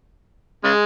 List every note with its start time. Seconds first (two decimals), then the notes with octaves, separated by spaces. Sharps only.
0.64 C#3 G#3